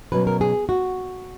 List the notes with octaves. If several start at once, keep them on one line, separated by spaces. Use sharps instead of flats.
B2 F#3 C#4 B4
A#4
G#4
F#4